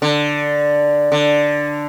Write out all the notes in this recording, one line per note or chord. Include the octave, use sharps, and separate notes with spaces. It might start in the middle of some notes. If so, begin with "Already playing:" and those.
D3
D3